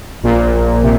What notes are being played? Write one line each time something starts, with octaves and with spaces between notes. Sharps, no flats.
A#1 A#2
C3